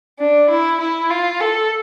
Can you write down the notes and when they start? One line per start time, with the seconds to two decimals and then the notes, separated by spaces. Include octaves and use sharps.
0.20 D4
0.50 E4
0.81 E4
1.10 F4
1.40 A4